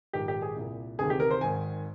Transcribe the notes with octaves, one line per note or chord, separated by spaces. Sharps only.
A#1 G#2 D#3 G4
G4
G#4
C2 A#2
D2 C3 D#3 G#4
G4
A#4
C5
G#1 G#2 D#3 G#5